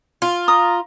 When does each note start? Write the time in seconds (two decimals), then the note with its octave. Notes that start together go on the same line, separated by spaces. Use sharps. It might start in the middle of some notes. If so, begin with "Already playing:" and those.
0.22 F4
0.48 A#5 D#6